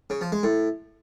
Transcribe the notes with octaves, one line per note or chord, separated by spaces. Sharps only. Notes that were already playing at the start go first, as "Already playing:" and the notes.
C#3
F3
G#3
A2